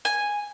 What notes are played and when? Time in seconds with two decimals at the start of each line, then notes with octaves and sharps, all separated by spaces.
0.05 G#5